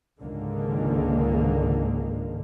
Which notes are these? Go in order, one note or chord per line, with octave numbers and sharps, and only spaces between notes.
C#2 G#2 D3 D#3 A#3